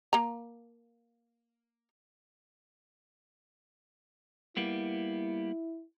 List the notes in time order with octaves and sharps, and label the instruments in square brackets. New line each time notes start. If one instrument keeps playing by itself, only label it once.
[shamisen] A#3 A#5
[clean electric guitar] G3 A#3 B3 [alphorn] E4